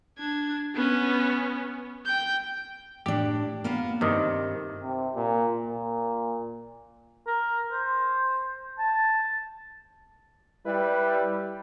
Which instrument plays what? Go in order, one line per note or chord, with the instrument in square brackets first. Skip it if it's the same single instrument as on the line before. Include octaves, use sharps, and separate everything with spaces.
[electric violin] D4 G#6
B3 C#4
G5 G6
[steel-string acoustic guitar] A2 D4 [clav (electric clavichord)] G4
[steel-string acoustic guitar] A#3 B3 F5
[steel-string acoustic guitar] G2 [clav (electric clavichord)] C3 D#3
[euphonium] C3
A#2
A#2
[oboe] A#4
C5
A5
[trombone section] G3 E4 B4